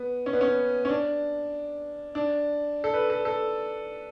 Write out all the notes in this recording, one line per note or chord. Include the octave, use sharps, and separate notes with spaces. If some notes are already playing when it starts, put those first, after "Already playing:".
Already playing: B3
C#4
B3
C#4
C#4
D4
D4
A4
B4
A4
A4